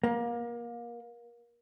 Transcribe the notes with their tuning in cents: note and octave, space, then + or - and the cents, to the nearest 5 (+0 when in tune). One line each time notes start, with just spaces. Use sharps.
A#3 +25